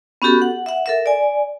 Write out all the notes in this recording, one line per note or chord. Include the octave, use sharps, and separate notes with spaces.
B3 C#4 F#4 G4 A4
F#5
E5 F#5
A4 A#4 E5
D5 G#5